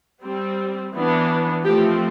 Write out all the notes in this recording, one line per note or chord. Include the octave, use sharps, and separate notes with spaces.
G3 C4
E3 B3 D4
F3 A3 C4 G4